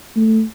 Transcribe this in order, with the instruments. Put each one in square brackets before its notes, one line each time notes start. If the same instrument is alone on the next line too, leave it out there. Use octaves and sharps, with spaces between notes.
[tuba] A3